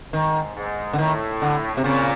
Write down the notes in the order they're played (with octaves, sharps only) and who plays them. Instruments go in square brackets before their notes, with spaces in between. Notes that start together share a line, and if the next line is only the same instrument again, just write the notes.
[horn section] G#2 [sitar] D#3
[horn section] G#2
[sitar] D3
[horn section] A2 [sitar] D#3
[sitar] D3
C3
[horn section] A#2 [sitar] C#3